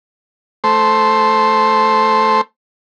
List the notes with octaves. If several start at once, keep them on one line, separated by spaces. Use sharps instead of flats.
A3 C5